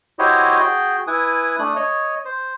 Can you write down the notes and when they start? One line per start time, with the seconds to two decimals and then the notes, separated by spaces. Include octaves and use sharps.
0.19 E4 F#4 G4 C5 C#5 D#5
0.59 F#4 G#4 G5
1.07 E4 B4 G#5 D#6
1.59 A3 D4 D#6 F#6
1.76 C#5 D#5
2.25 C5